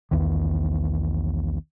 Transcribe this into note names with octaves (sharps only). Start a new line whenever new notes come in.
B1 E2 D#3